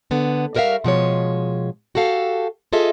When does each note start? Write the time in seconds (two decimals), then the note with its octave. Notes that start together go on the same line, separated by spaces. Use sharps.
0.11 D3 B3
0.55 G3 F#4 A#4 C5 E5 F5
0.84 B2 F3 G#3 C#5
1.95 F#4 G4 A4 F5
2.73 F4 G#4 A4 D#5 E5